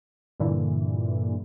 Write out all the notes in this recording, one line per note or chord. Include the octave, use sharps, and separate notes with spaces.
G2 A#2 D3 E3